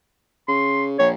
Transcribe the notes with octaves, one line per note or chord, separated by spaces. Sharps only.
C#3 C6
A#1 C#5